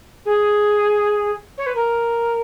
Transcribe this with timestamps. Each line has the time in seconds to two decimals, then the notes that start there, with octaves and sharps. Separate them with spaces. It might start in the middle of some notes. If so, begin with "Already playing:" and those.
0.25 G#4
1.57 C#5
1.66 B4
1.75 A#4